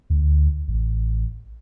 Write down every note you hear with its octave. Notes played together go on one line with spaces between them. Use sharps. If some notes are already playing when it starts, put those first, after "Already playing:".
D2
A1